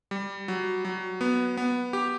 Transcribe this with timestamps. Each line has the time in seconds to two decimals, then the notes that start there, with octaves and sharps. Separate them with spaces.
0.11 G3
0.48 F#3
0.85 F#3
1.21 B3
1.57 B3
1.93 G4